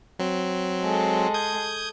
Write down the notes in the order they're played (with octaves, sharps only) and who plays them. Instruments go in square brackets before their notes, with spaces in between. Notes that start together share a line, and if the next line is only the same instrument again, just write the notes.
[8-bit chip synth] F#3 C4
[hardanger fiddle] G#3 A4
[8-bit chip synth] D#6 G6 G#6